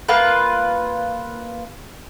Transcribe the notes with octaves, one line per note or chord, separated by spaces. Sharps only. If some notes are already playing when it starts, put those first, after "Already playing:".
A#3 F4 B4